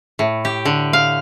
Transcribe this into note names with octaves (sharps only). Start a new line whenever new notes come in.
A2
G4
D3
F5